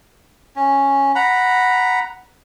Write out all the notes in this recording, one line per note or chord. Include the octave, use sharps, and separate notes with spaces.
C#4
F#5 A#5 B5